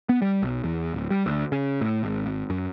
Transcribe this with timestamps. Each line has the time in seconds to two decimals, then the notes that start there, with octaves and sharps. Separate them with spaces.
0.09 B3
0.22 G3
0.43 B1
0.64 E2
0.94 D1
1.10 G3
1.26 D2
1.52 C#3
1.81 A2
2.03 G#1
2.26 G#1
2.50 F#2